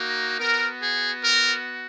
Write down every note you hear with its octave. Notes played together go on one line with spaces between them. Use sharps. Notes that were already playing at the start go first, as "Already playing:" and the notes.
Already playing: A#3 D#4 F#4
B3 F#4 A#4
G#4
A#4